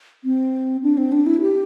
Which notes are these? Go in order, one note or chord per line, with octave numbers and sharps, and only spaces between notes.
C4
D4
C4
D4
E4
G4